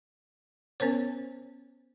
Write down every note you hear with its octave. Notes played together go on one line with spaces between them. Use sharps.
B3 C#4 A#4 C5 C#5